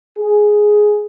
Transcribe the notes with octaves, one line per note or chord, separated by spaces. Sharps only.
G#4